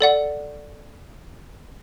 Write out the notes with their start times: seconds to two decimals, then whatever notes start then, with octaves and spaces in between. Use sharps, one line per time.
0.01 A4 D5 F#5